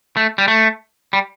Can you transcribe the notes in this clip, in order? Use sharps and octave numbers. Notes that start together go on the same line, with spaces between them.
A3
G3
A3
G3